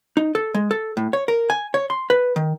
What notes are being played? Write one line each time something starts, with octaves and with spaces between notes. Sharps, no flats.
D#4
A4
G#3
A4
A2
C#5
A#4
G#5
C#5
C6
B4
D#3